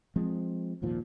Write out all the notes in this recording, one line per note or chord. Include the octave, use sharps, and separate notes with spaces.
F3 G#3 C4
G#1 D#2 A#2 F3